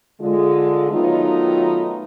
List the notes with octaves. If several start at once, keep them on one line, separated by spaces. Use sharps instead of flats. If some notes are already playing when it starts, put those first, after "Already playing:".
D3 G#3 F4
D#3 F#3 A3 B3 D#4 F4